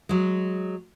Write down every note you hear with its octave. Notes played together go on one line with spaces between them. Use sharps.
F#3 G#3